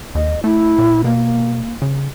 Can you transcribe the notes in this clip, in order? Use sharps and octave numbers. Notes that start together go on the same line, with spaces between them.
D#2 D#5
A3 E4
A#2
B2 A#3
C#3